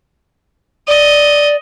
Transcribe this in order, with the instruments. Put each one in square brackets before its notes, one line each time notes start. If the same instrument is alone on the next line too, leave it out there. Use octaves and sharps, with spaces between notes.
[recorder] D5 [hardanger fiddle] D#5